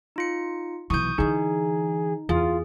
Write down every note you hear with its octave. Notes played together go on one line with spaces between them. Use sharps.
D#4 F4 C#7
B1 E3 C#6 D#6 G6
D3 E3 D#4 G#4
E2 F4 G#4